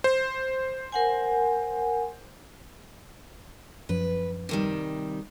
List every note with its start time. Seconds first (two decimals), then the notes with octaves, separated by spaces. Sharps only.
0.04 C5
0.92 A#4 F#5 G#5
3.89 F#2 F3 B4
4.49 C3 D#3 G3